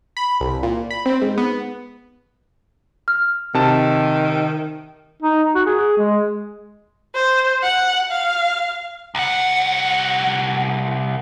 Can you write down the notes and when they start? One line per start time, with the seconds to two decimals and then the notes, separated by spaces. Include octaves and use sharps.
0.17 B5
0.40 C2
0.63 A#2
0.91 B5
1.06 C4
1.21 G#2
1.38 B3
3.08 F6
3.54 C3 D#3 A5
5.22 D#4
5.55 F#4
5.66 G#4
5.98 G#3
7.15 C5
7.63 F#5
8.11 F5
9.15 C2 F#5